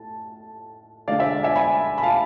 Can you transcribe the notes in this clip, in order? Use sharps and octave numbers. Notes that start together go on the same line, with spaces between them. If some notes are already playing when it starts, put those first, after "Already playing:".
Already playing: A2 A5
D3 G#3 D5 F5
C5 E5
E5 G#5
G#5 B5
B5
F5 A5